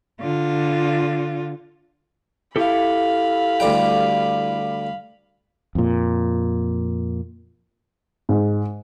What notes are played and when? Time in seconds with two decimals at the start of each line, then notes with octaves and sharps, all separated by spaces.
0.22 D3 F4
2.56 E4 G4 A4 F5 B5
3.60 D2 G3 G5
5.75 F2 A#2
8.29 G#2